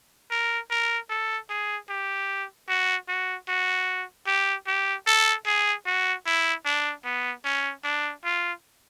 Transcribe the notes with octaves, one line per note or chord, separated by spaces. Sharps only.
A#4
A#4
A4
G#4
G4
F#4
F#4
F#4
G4
G4
A4
G#4
F#4
E4
D4
B3
C#4
D4
F4